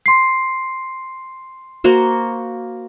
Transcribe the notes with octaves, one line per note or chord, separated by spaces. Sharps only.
C6 C7
A#3 F#4 C5